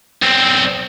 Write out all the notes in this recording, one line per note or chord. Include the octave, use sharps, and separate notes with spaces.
B1 C4